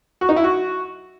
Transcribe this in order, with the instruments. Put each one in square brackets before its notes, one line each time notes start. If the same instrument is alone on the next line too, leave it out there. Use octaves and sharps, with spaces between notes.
[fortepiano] F#4
D#4
E4
F#4